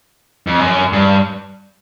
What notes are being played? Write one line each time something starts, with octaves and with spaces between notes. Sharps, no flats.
F2
F#2
G2